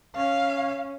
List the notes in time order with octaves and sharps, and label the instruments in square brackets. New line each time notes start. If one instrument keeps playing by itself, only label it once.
[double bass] C#4 [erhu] F5